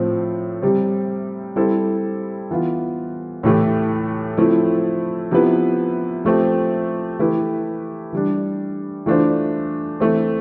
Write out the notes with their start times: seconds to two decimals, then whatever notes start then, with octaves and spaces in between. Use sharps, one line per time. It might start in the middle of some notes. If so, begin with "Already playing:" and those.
Already playing: A2 F3 C4
0.62 C3 G3 C4
1.56 G3 C4 E4 A4 C5
2.51 E3 B3 F4
3.43 A2 E3 A3 E4 G4
4.37 F3 A3 C4 E4
5.31 C3 F3 B3 E4 B4
6.25 F3 A3 C4 G4
7.19 E3 A3 E4 G4 B4
8.13 E3 G3 D4
9.06 E3 A3 D4 F4 C5
10.00 E3 A3 C4